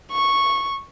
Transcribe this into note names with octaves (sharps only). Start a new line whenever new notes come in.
C#6